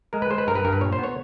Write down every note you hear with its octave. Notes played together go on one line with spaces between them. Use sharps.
G#3 A#4
B4
G#3 C5
B4
G2 A#4
B4
G2 A#4
B4
A#2 C#5
C5
B3 C#5